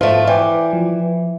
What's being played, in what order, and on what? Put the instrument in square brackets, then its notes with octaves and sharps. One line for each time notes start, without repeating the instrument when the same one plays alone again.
[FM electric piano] G#2 [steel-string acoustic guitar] F3 A3
[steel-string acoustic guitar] E3 [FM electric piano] D5 G5 D6
[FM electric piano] F3